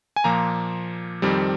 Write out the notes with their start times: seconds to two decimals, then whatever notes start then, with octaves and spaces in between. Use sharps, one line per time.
0.16 G#5
0.24 A#2 F3 A#3 A#5
1.22 F2 D#3 G3 C4